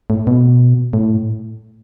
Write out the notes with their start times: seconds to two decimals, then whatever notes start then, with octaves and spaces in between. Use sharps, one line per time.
0.10 A2
0.27 B2
0.93 A2